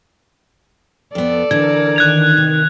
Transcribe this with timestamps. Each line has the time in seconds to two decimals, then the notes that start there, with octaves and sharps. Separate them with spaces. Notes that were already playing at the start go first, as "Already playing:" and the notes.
1.15 F2 B3 A4 D5
1.51 D3 E3 A#4 G#6
1.96 D#3 F#6 G#6 F7
2.37 C3